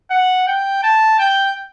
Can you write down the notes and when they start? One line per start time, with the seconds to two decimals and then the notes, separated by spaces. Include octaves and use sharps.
0.11 F#5
0.47 G5
0.83 A5
1.19 G5